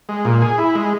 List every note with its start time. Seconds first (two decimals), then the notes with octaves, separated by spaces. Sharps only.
0.09 G#3
0.25 A#2
0.42 G#4
0.58 E4
0.75 G#3